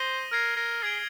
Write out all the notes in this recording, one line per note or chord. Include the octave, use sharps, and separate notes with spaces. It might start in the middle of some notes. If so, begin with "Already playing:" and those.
Already playing: C5 D#6 A#6 D#7 G7
A#4 F6 G#6 C7
A#4
G#4 D#6 G#6 D7 G7